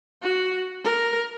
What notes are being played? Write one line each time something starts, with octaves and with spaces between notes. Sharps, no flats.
F#4
A#4